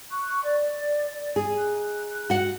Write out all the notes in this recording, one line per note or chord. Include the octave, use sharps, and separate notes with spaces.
C#6 F#6
D5
G#4
D#4 F#6
F#4 F#5